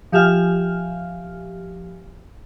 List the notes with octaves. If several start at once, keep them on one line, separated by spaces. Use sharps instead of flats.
F3 G4 E5 F5 G#5 F6